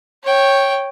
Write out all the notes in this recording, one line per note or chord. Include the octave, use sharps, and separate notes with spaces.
C#5 G5